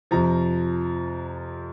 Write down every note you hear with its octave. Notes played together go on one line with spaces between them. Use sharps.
F2 C3 F3 A#5